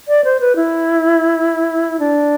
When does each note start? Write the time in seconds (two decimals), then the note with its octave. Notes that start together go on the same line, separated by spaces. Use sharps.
0.08 D5
0.24 C5
0.40 B4
0.56 E4
2.00 D4